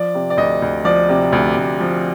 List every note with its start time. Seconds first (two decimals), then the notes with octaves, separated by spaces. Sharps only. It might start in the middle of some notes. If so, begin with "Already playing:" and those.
Already playing: F3 D5
0.15 C3
0.30 D5
0.37 D2 D#5
0.62 D2
0.85 F3 D5
1.09 C3
1.32 D2
1.56 D2
1.80 F3